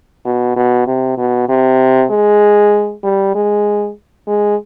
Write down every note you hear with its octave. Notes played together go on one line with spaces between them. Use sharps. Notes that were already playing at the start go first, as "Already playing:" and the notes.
B2
B2
C3
B2
C3
G#3
G3
G#3
G#3